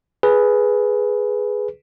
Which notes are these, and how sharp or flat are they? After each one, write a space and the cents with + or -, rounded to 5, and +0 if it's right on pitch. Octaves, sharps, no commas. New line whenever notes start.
G#4 +5 B4 +0